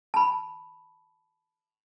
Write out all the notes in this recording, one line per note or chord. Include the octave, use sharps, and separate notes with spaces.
A5 B5